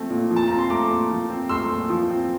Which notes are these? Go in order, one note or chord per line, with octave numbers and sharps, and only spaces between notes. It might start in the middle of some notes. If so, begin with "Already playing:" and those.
Already playing: A#2 F3 A3 C4
A#2
F3
A5
C4 A#5
C6
A3 A#5 D6
A#2
F3
C4
A3 C6 E6
A#2
F3
C4